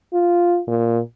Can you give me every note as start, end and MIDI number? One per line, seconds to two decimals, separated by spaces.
0.13 0.60 65
0.67 0.99 46